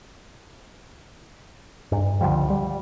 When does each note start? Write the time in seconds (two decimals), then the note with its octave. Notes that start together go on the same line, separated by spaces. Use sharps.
1.92 G2
2.21 C#2 D3 F3 G3
2.50 G3